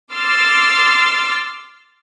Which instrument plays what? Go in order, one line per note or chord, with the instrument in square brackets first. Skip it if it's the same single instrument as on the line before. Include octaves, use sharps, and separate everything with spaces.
[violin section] C6 D6 E6 F6 A6 C7